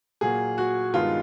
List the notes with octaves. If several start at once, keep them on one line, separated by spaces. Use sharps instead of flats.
A#2 F#3 A#3 G#4
F#4
G2 D#3 G#3 B3 F4